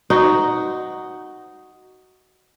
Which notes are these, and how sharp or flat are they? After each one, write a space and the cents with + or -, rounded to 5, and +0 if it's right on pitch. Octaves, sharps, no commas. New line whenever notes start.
D#4 +0 F#4 +5 C5 -25